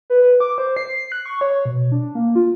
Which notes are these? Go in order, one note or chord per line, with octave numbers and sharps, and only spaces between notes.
B4
B4
D6
C5
C7
F#6
C#6
C#5
B2
D4
A#3
F4